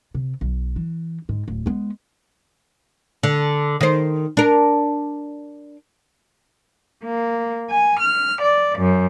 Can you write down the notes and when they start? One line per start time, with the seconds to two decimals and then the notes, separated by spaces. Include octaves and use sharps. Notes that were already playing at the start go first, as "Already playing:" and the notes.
0.14 C3
0.41 B1
0.76 E3
1.29 G#2
1.48 D1
1.66 G#3 B3
3.23 D3
3.81 D#3 C5
4.37 D4 A#4
7.04 A#3
7.70 G#5
8.01 F6
8.42 D5
8.77 F#2